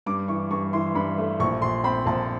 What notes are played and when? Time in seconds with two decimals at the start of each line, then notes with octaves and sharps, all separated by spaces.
0.06 G2 D6
0.28 E3 C#6
0.50 G2 C#6
0.73 E3 C6
0.95 G2 B5
1.18 A3
1.40 A#1 C#6
1.62 A#1 C6
1.84 C4 B5
2.06 A#1 A5